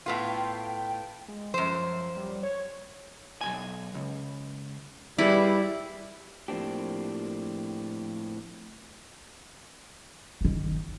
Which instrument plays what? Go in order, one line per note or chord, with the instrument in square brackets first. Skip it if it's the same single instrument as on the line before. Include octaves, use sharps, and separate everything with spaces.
[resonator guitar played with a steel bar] A2 B3 F4
[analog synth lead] G5
G#3
[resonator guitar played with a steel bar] F#2 C5 [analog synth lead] F3
[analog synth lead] G3
C#5
[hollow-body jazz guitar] B1 G2 G#5
C#2
[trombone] G3 [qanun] E4 [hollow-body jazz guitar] G#4 B4 D5
[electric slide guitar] A2 F3 A#3 C4 D4 G4
[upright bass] G1 D#3